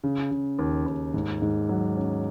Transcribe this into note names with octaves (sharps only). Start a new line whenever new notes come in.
C#3
C#3
D#2
D#2
G#2
G#2
F#3
C#4